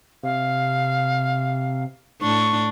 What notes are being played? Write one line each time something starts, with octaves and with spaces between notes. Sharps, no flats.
C3 F5
A2 D4 C#6